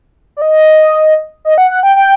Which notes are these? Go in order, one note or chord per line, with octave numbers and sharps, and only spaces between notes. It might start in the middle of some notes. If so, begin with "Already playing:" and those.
D5
D#5
D#5
F#5
F#5
G5
G5